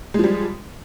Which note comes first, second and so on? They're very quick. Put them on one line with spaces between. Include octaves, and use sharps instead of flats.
G#3 F3 G3